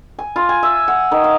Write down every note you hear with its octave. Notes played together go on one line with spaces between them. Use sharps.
G#5
F4
G#5
E5
F#5
D#3
F5